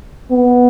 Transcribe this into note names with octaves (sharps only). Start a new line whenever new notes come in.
B3